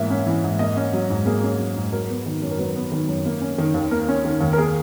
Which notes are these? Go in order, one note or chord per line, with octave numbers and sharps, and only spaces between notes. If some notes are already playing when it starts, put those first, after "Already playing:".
Already playing: G#2 E3 A#3 E5
C#4
E3
G#2
A#3 D#5
C#4
F#3
G#2
A#3 G#4
C#4
F#3
G#2
F#3 A#4
B3
D#3
F#2
A#4
F#3 B4
B3
D#3
F#2
A#3
C#4
D#3
D#2
A#3 A#4
C#4
D#3
D#2
A#4
A#3 G#4